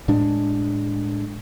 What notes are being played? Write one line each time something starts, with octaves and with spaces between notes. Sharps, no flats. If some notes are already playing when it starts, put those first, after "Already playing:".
A2 G#3 D4